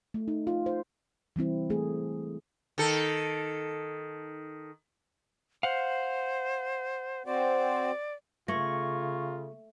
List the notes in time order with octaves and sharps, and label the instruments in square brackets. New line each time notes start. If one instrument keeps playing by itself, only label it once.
[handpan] A3
D#4
F4
C5
E3 G3 C4 E4
A3 G#4
[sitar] D#3 A4
[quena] C5 [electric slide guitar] F5 F#5
[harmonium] C4 F#4 C5 [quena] D5
[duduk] C#3 [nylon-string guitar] A3 [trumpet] F4 [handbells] C#6 G#6 A#6